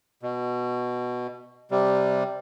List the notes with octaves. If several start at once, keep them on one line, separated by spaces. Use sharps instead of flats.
B2
C3 G3